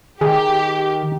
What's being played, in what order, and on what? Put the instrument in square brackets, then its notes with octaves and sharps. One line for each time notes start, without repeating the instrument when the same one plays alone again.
[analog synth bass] D#3 [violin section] G4 [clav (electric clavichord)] G#4